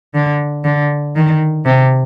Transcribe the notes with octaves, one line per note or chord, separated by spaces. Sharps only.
D3
D3
D#3
C3